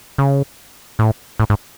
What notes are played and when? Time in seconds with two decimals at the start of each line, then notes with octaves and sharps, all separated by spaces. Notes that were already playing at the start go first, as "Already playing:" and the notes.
0.18 C#3
0.99 A2
1.40 A2
1.50 G#2